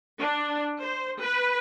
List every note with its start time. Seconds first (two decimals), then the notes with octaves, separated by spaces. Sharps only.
0.19 D4
0.80 C5
1.20 B4